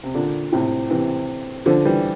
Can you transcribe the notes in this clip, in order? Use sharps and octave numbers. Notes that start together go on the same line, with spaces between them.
C3
A#2 D3
A2 C3
C3 E3
D3 F3
E3 G3